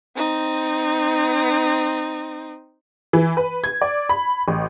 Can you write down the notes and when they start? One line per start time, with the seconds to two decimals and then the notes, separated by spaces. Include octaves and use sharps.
0.16 C4 D#4
3.13 E3
3.37 B4
3.64 G#6
3.82 D5
4.09 B5
4.48 A1